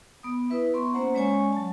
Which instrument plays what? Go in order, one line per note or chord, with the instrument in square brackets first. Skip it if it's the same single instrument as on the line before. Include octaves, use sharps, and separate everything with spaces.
[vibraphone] B3 D#6
E4 B4 E5
B3 C6 C#6
A#3 C#4 C5 F#5 A#5
G#3 C#4 C#5 D5 G#5 C#6
F#3 A5